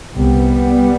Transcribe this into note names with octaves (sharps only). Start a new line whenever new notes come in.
C2 C3 G3 B3